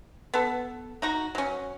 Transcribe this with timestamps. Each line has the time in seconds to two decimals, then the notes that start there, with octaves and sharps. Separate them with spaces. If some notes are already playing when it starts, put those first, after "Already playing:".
0.34 B3 A4
1.02 D#4 F#4 A#5
1.35 F#3 C#4